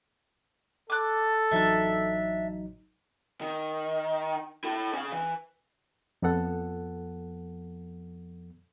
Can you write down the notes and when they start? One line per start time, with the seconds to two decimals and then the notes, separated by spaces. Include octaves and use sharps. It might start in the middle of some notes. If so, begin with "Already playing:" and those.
0.90 A4 D6 F#6
1.52 A1 F#3 D4 D#4 E5
3.41 D#3
4.64 E4 A4
4.93 C#4 F5
5.12 E3
6.22 F2 F3 B3 A4 F#5